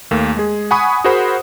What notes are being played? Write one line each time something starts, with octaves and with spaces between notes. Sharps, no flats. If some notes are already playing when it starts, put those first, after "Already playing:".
D#2 A3 A#3
G#3 G#4
F#5 G#5 B5 C#6 D#6
F#4 G#4 A#4 C5 F#5 B5